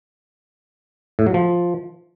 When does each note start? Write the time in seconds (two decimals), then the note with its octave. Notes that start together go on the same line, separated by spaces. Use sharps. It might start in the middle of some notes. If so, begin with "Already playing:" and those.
1.19 A2
1.27 F#3
1.34 F3